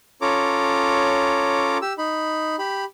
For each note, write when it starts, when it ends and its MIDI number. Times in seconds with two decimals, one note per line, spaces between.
0.22 1.78 61
0.22 1.78 65
0.22 1.78 69
0.22 1.78 73
0.22 1.78 82
0.22 1.78 86
1.82 1.93 67
1.82 1.93 88
1.98 2.56 63
1.98 2.56 83
2.59 2.84 67
2.59 2.84 83